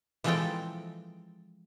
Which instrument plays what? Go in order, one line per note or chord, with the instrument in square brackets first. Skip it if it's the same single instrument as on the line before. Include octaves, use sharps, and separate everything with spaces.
[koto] E3 F3 G#3 C4 A4 G5